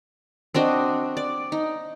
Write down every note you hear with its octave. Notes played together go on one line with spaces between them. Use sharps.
C4 D4 F#4 D#5
D5
D#4